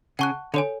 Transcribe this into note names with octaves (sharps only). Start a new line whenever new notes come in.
C#3 F#5 A5 C#6 F#6
D3 A4 C#5 G#5